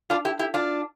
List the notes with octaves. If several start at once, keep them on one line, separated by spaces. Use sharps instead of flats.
D4 F4
E4 G4
E4 G4
D4 F4